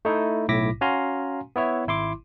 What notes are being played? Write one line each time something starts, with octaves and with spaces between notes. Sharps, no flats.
A3 D#4 E4
B1 A2 E4 D6 A#6 B6
C#4 F#4 F5 G#5 A#5 C6
B3 E4 C#5 E5
G#1 E4 C6 D6